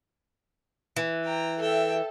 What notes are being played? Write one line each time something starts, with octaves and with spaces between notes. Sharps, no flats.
E3
G5 A#5
A4 E5 G5